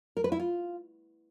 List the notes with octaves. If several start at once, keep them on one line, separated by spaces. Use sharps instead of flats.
A#4
B4
E4
F4